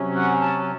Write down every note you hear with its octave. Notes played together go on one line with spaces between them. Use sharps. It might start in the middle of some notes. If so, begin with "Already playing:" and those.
Already playing: C3 F#3 C#4
F#5
A5